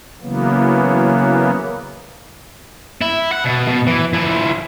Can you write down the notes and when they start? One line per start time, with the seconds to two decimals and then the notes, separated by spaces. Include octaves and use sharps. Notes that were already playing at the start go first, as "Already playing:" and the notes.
0.21 C#3 E3 F#3 A#3 B3
3.01 E4
3.32 F#5
3.44 B2
3.68 B2
3.87 E3
4.14 F3 E4